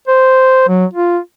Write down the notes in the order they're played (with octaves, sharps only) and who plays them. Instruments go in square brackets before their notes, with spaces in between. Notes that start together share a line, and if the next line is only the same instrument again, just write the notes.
[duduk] C5
F#3
F4